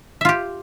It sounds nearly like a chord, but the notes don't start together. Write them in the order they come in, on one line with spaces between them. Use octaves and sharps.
E5 F4 G4